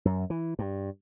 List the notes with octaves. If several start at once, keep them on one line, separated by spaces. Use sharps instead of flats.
F#2
E3
G2